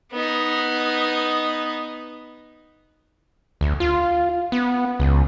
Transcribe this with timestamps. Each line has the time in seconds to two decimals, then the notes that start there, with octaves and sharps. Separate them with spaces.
0.13 B3 D#4
3.61 D2
3.80 F4
4.52 B3
5.00 C#2